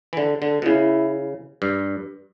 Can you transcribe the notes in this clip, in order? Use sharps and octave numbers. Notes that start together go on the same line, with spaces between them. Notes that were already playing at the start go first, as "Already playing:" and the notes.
E3
D3
D3
B2
C#3 E4
G2